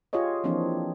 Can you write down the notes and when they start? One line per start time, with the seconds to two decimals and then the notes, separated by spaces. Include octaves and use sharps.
0.13 F4 G4 G#4 C#5 D#5
0.44 E3 F3 A#3 C4 D4